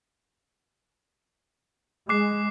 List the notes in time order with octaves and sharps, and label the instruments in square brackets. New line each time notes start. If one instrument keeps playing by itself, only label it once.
[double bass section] G#3 [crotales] D6 F#6 C7